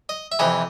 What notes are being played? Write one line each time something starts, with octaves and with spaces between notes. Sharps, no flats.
D#5
E5
F2 C3 E3 D#5